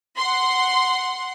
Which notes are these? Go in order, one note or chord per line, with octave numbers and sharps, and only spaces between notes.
F#5 C6